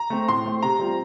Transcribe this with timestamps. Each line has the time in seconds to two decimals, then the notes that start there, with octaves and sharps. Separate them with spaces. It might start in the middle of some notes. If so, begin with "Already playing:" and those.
Already playing: A#5
0.10 A3 C4
0.29 A2 C6
0.46 A3 C4
0.63 C3 A#5
0.79 G3 C4 F4